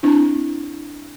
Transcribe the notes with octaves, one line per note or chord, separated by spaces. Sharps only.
C4 D4 E4